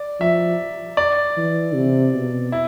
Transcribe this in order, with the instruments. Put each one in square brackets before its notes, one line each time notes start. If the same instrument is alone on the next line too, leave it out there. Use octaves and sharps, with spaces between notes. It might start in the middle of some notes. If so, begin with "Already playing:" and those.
Already playing: [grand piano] D5
[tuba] F3 [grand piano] E5
[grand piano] D5
[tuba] E3
C3
B2
[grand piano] E4